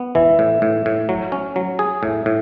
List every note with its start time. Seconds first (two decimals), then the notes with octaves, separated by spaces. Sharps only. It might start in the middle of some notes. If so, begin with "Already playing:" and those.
Already playing: B3
0.15 E3 E5
0.39 A2
0.62 A2
0.86 A2
1.09 F#3
1.32 C#4
1.56 F#3
1.79 G#4
2.03 A2 E5
2.26 A2